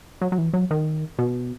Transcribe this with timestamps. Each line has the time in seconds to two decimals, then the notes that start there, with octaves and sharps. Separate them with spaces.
0.21 F#3
0.32 F#3
0.38 E3
0.53 F#3
0.71 D#3
1.19 B2